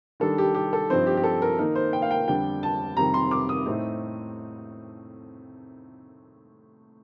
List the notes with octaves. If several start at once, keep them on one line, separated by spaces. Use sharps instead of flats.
D#3 G3 D4 A4
G4
G4
A4
G2 F3 C4 D#4 C5
G4
G4
A4
A#4
D#3 A#3 D#4 A#4
C5
G5
F5
G5
F2 D3 G3 D4 G5
A5
F2 C3 D#3 G3 A#5
C6
D6
D#6
A2 A3 C4 D#4